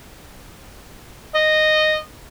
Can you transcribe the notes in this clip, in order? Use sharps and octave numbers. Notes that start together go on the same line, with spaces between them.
D#5